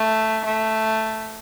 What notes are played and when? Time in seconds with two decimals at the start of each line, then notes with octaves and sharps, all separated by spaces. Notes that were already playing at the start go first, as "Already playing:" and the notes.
Already playing: A3
0.44 A3